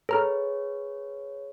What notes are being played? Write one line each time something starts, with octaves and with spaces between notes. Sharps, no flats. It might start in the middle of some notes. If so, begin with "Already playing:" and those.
G#4 A4 B4 C#5 A#5 F6